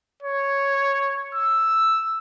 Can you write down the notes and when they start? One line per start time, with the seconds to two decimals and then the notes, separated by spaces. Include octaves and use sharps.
0.22 C#5
1.35 E6